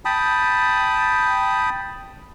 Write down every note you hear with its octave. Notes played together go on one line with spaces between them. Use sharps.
G5 A5 B5 D#6